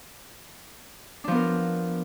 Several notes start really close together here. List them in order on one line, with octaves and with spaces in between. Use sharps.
D4 F3 B3 A#4